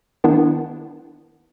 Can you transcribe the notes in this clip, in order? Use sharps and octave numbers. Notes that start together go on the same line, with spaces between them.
D#3 B3 D4 E4